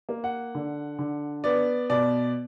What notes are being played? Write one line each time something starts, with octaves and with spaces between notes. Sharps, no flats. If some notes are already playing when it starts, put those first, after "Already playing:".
A#3
F#5
D3
D3
B3 D5
B2 D5